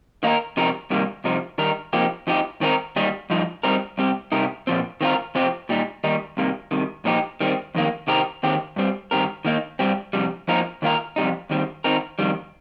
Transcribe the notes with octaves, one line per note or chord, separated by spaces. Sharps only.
D#3 A#3 D#4 A#4
C3 F3 D#4 A#4
C2 C3 D#3 G3 A#3
C2 C3 F3 D#4
D#3 G3 D#4 A#4
C3 F3 A#3 D#4 G4
F2 F3 D#4 G4
D#3 C4 D#4 A#4
D#2 D#3 G3 D#4
G2 F3 D#4
G2 G3 C4 D#4 A#4
C2 C3 G3 C4 G4
C3 G3 D#4 G4 A#4
A#2 F3 C4
D#3 C4 F4 A#4
F2 C3 F3 C4 G4
A#2 G3 D#4
D#2 D#3 G3 D#4
C2 C3 D#3 A#3
C2 C3 D#3
A#2 F3 D#4 G4
D#3 G3 C4
F2 D#3 A#3
C3 D#3 C4 G4 A#4
D#2 D#3 C4 G4
G2 G3 C4
G2 D#3 C4 G4 A#4
D#3 A#3 D#4
G2 G3 C4 G4
F2 C3 G3
F2 F3 A#3 D#4 A#4
D#2 D#3 A#3 F4 A#4
F2 C3 G3 D#4
D#2 D#3 G3 C4
D#3 C4 D#4 A#4
F2 D#3 G3